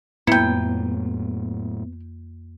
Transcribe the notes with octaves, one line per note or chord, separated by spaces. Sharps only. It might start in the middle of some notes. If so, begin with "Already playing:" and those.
F2 A2 F#3 A#3 B3 E4 G5